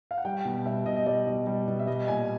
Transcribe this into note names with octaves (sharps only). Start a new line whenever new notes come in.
F5
F#5
G3 G5
B2
G3 E5
B2 D#5
D#5
G3 D5
B2
G3
B2
E5
G3 D#5
A#2 G#5